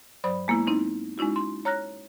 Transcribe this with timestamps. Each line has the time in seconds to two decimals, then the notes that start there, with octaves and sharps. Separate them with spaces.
0.24 G2 F#3 C5 D5 B5 D#6
0.48 G#3 A#3 B3 E4
0.67 C4 D#4 E4
1.18 G#3 C#4 D#4 E4 F#4
1.36 C6
1.65 C#5 A#5 F6 F#6 A#6